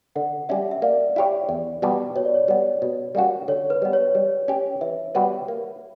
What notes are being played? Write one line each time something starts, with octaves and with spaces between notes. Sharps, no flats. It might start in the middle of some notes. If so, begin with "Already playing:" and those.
D3 F#5
G3 C#4 E5
E5
A#3 D5
E4 G4 C#5
E2
B2 G3 B3
B2 C#5
D5
C#5
G3 B3
B2
G3 A#3 C#4 F#4
D3 C#5
B4
G3 B3
C#5
G3
C#4 G4
E3 E5
G3 B3 F#4 B4
A#3